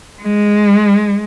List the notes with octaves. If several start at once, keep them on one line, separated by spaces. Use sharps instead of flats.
G#3